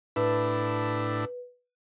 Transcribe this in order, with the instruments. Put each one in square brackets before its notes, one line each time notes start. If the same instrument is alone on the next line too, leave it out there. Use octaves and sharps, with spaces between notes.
[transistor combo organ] A2 D4 E4 [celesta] B4